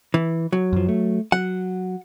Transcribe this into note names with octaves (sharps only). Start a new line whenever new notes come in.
E3
F#3
F#2 F3
A3
F#3 F#5